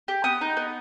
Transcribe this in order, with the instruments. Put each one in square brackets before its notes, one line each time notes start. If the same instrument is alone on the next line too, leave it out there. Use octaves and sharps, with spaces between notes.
[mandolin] G4
B3 D#6
D#4
B3